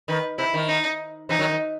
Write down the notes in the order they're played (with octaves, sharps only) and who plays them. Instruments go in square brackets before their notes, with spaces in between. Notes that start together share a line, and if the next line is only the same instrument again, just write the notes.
[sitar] D#3 [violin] B4
[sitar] C3 [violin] E4
[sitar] D#3
[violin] D#4
[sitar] C3 E3 [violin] D#4
[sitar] D#3 F#3
D#3